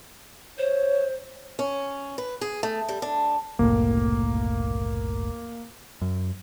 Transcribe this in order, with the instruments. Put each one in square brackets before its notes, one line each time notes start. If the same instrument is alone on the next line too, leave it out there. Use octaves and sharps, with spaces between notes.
[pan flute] C5 [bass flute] C#5
[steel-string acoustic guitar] C#4
B4
G#4
A3
G3
D4
[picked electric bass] F#1 C2 A2 [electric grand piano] A#3
[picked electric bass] F#2